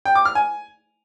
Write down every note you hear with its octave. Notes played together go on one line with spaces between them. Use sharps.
G5
D6
F6
G#5